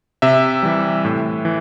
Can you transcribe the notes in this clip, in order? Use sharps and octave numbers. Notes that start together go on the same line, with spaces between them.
C3 E5
E3 G3
A2
E3